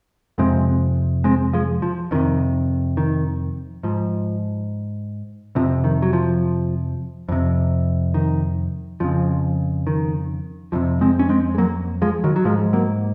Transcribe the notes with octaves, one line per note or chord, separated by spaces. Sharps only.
F2 C3 G#3 C4
G#3 C4
F3 G#3
F3
F2 C3 D#3
D#3
G#2 F3
F2 C3 F3
D#3
F#3
F3
F2 C3
D#3
F2 C#3 F3
D#3
F2 C3 F3
G#3 C4
C#4
G#3 C4
G#3
F#3 A#3
F3 G#3
D#3 F#3
F#3
G#2 F3 G#3
F#3 A#3